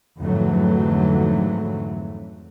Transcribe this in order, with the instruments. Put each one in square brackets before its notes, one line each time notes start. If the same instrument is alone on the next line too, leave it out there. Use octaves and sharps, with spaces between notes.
[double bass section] F2 G#2 D3 E3 F#3 A3